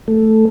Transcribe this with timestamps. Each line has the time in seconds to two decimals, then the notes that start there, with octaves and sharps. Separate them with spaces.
0.08 A3